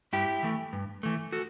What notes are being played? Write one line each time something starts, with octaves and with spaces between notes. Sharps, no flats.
G2 E4 G4
E3 A3
G2
E3 A3
F#4 A4